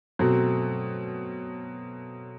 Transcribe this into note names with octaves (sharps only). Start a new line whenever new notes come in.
B2 F#3 A3 C4